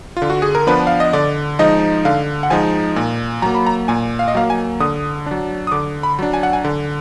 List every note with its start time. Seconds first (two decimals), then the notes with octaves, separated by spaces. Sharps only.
0.17 F4
0.22 D3
0.30 F#4
0.42 G#4
0.55 A#4
0.67 F3 B3 D4 B4
0.87 F5
1.00 D#5
1.13 D3 D5
1.59 F3 G#3 D#4 D#5
2.05 D3 F5
2.43 F#5
2.50 F3 G#3 D#4 G#5
2.96 A#2
3.42 F#3 A#3 A#5
3.55 B5
3.66 A#5
3.88 A#2 G#5
4.19 F5
4.28 D#5
4.35 F#3 A#3 F5
4.50 G#5
4.80 D3 D#6
5.26 F#3 D4
5.67 D#6
5.72 D3 D6
6.03 B5
6.19 F#3 D4
6.34 G#5
6.43 F#5
6.53 G#5
6.65 D3